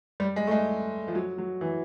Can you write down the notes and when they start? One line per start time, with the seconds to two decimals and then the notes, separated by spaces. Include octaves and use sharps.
0.20 G3
0.36 G#3
0.47 A3
0.51 G#3
1.08 F3
1.15 F#3
1.38 F#3
1.61 E3